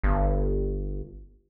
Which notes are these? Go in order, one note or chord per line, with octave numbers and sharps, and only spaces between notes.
G1